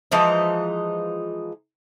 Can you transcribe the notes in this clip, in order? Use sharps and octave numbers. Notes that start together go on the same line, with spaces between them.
E3 F3 G#3 D#4